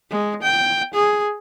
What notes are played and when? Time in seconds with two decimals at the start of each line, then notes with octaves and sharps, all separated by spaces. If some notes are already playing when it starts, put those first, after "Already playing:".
0.10 G#3
0.43 G5
0.94 G#4